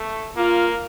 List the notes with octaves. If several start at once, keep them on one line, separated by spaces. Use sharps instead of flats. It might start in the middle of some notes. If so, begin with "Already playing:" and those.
Already playing: A3
A#3 F4